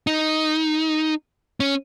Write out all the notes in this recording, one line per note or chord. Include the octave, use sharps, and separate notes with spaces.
D#4
C#4